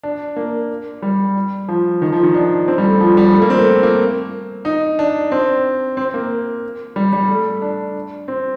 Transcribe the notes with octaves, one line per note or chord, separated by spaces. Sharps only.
D4
A#3
G3
F3
D#3
F3
D#3
D4
C4
G3
A3
F3
G3
A3
A#3
C4
A3
A#3
D#4
D4
C4
C4
A#3
G3
G3
A3
D4
C4